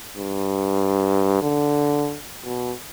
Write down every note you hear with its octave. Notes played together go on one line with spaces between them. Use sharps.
G2
D3
B2